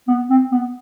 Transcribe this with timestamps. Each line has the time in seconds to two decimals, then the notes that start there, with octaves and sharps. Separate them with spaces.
0.08 B3
0.30 C4
0.52 B3